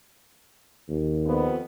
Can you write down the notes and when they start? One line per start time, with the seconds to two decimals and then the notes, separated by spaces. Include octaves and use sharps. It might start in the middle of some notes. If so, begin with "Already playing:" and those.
0.89 D#2
1.25 F2 B3